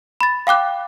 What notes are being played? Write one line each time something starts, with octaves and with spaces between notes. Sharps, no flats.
B5 A6
F5 G5 D6 F#6